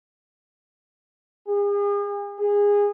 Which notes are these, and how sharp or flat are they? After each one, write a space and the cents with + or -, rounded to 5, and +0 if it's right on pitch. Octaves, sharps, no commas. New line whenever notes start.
G#4 -40
G#4 -20